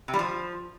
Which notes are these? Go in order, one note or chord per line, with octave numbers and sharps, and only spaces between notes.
C3
G3
F3